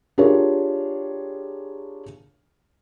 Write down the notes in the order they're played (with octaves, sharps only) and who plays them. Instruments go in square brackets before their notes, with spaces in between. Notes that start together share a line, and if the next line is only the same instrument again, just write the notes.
[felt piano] D4 F4 G4 G#4 A#4 C#5